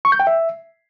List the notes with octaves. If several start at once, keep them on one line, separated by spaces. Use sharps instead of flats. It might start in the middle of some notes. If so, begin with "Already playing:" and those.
C#6
G6
G5
E5